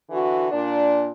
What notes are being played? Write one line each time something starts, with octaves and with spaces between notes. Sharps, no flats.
D3 E3 F#4
A#2 D4